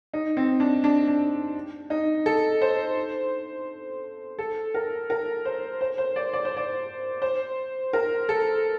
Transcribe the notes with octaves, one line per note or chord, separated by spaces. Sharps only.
D#4
C4
D4
D4
D4
D#4
A4
C5
A4
A#4
A#4
C5
C5
C5
D5
D5
C5
D5
C5
A#4
A4